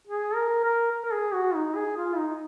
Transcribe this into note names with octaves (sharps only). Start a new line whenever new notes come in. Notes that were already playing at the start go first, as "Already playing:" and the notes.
G#4
A#4
A#4
A#4
A#4
G#4
F#4
D#4
G#4
F4
D#4